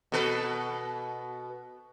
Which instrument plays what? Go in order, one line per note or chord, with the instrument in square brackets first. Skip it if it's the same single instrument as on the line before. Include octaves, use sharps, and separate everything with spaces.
[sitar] B2 A4 B4